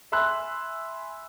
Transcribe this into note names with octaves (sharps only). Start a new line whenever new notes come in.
E5 G#5 B5 C6 E6 F#6